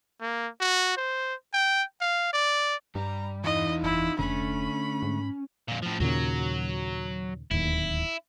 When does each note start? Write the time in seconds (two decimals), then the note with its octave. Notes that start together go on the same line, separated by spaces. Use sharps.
0.21 A#3
0.61 F#4
0.97 C5
1.54 G5
2.01 F5
2.33 D5
2.95 G2 G3 A#5
3.44 E2 E3 D#4 F4 D#5
3.83 F#1 E4
4.19 F1 D3 A3 C#4 B5
5.03 G#2
5.68 F2 A#2
5.82 A2 F3
6.00 D#2 A#2 C#3 F#3
7.51 D1 D#2 E4